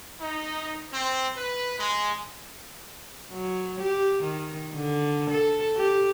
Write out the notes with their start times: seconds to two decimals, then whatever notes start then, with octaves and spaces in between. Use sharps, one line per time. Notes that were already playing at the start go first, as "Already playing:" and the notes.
0.20 D#4
0.92 C4
1.35 B4
1.79 G#3
3.32 F#3
3.80 G4
4.23 D#3
4.75 D3
5.30 A4
5.77 G4